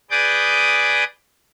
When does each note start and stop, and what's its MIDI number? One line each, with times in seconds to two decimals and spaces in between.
0.10 1.04 68
0.10 1.04 71
0.10 1.04 74
0.10 1.04 86
0.10 1.04 87
0.10 1.04 91